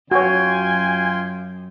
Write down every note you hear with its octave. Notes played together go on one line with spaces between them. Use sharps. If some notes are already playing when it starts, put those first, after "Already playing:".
F#2 F4 F#4 C#5 G5 G#5 C6